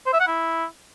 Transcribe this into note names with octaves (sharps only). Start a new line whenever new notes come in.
C5
E5
F#5
E4